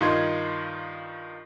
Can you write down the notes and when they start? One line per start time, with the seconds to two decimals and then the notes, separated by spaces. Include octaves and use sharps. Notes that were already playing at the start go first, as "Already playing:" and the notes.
0.01 G2 D#3 D#4 F4 C6 G#6